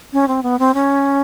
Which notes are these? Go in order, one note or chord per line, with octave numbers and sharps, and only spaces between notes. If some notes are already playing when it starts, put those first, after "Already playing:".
C#4
C4
B3
C4
C#4